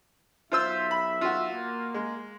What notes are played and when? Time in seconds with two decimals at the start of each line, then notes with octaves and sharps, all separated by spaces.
0.52 B1 F4 C5 E5 E6
0.91 B5
1.21 F4 F#4
1.52 A#3
1.94 G#3